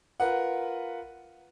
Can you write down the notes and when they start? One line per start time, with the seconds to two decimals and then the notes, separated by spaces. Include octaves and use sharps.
0.20 F4 A#4 B4 F#5